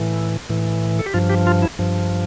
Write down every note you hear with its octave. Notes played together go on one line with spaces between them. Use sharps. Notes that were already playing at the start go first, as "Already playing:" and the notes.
Already playing: A2 E3
A2 E3
A4
G4
G2 F3 F4
G4
F4
E4
G2 F3